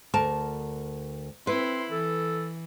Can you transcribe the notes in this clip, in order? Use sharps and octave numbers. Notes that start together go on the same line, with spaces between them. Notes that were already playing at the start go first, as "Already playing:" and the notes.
D2 A#4 A5
C4 E4 B4 C6
E3 A4